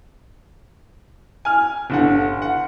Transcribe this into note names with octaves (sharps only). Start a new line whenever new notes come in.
G#5 F6
G1 D3 F#5
F#5